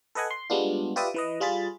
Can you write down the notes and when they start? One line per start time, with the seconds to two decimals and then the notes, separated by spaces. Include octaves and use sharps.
0.15 A4 B4 D#5 F#5 G#5
0.31 C6
0.50 G3 G#3 B3 D4 F4
0.96 F4 G4 B4 D5 E5 D#6
1.14 E3 B4 D#5
1.40 G3 F4 G#4 B5 A6